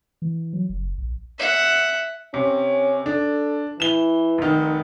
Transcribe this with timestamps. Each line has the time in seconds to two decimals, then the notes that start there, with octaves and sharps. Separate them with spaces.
0.22 E3
0.53 F#3
0.69 F#1
0.98 A#1
1.39 E5 F#5
2.34 C3 C#4
3.06 D4 A4
3.80 E3 E7 G7
4.38 F1 D#3